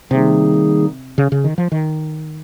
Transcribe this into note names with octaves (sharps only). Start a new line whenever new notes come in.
C3 D#3 G3 A#3 D#4 G#4
C#3
C#3
D#3
F3
D#3